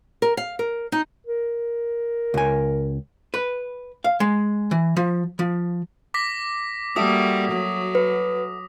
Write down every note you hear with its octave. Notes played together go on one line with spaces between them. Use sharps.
A#4
F5
A#4
D#4
A#4
C#2 G#5
B4
F5
G#3
E3
F3
F3
D6 A#6 B6
G3 A#3 F#4 A4 E5 D#6
F#3
B4